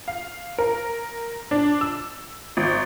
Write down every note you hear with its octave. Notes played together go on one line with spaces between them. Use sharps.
F5
A#4
D4
E6
G#1